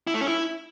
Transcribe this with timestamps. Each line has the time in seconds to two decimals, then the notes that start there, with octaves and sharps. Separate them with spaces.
0.07 E4
0.14 A3
0.21 C#4
0.28 E4